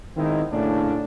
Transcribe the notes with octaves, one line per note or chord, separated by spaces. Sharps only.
D#3 G#3 B3 C4 D#4 E4
A2 C#3 A#3 C#4 D4